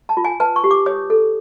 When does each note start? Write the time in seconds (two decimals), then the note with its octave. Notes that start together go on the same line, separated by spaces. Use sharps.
0.09 A5
0.17 F4
0.24 G#5
0.40 B4 A5
0.56 C#6
0.64 G4
0.71 D6
0.86 C#5 D#6
1.10 A4